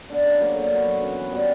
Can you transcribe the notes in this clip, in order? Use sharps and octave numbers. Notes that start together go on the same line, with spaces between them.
B3 D4
C#3
F#3 A#3
D3
F#3 B3 F#4
F#3
C#4 F#4 B4
E3
G3 B3 F#4